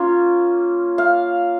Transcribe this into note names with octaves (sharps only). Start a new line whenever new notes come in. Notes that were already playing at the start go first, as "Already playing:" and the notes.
Already playing: A#3 C#4 F4
F5